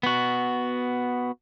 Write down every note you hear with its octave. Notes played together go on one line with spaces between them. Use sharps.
B3 F#4